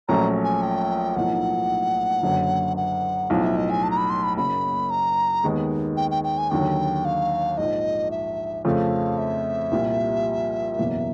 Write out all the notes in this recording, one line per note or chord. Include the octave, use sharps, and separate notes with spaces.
A#1 A#2 F#3 A3 C#4 A#5
G#5
G5
B1 A2 F3 A#3 D#4 F#5
F#1 F#2 D3 F#3
F#5
B1 A2 F3 F5
E5
D#5
G#5
A5
A#5
B5
C6
B5
F#1 F#2 C#3 F#3 A#3 B5
A#5
D#2 D#3 G#3 B3 D#4
G5
G5
G5
G#5
D#2 D3 F#3 G5
F5
A#1 G#2 F3 D#5
E5
F2 C#3 F3 A3 C4 F5
E5
C2 A#2 G3
F#1 E2 B2 F#3 A#3